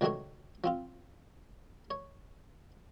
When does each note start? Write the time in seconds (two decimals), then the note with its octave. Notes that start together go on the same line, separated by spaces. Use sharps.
0.01 C#2 D#3 F#3 A3 D4 C#5
0.64 F3 C4 F4
1.90 C#5